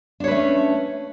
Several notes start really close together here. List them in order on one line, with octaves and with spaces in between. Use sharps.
D4 C#5 B4 A3 C#4